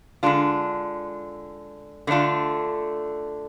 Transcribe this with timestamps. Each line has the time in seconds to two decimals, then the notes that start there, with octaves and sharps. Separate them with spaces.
0.23 D3 G#3 D4 F4
2.07 D3 A3 D4 F4